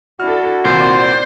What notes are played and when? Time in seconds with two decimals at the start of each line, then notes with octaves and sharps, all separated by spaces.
0.20 D4 E4 F#4 A4 F6
0.65 C2 A#2 D#3 C4 A#4 C5 D5